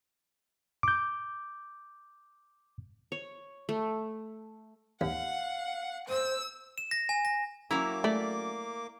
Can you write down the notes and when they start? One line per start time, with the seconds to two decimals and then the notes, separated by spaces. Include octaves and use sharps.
0.83 D6 G6
3.12 C#5
3.69 A3
5.01 D#2 F5 F#5
6.09 C5 E6
6.78 E7
6.91 A#6
7.09 G#5
7.25 A#6
7.71 F#3 A#3 C#4 E4 A#5 D6
8.04 A3 D5